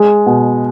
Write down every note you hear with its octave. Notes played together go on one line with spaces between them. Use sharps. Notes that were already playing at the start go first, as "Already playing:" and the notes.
Already playing: G#3
B2